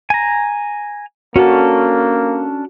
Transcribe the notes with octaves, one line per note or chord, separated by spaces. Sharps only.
G#5 A#5
A#3 C#4 D4 F#4 A4